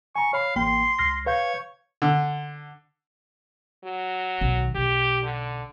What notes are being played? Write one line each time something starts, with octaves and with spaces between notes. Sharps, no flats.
G#5 A#5 C#6
C#5 F5 B5
A1 A#3 G5 C6
C#2 F6 A#6
B4 C#5 F5 G6
D3
F#3
B1 D#3
B1 G4
D3